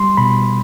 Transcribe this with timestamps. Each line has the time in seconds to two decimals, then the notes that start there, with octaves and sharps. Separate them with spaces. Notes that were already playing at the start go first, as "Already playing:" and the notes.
Already playing: G3 C6
0.17 B2 B5